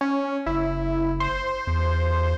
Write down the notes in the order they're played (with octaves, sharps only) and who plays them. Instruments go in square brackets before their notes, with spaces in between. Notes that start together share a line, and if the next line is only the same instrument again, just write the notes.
[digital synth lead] C#4
[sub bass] F#1 [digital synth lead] E4
[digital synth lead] C5
[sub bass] E2